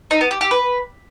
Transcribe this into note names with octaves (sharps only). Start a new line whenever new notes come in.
D#4
B3
G4
G4
B4